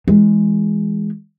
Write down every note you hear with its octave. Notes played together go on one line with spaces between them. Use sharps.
E3 G#3